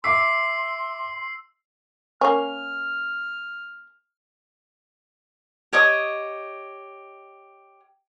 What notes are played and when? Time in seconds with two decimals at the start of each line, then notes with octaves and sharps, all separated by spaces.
0.04 E5 C6 D6 E6 B6 C7
2.21 A#3 C#4 F6
5.73 G4 C#5 D#5 D#6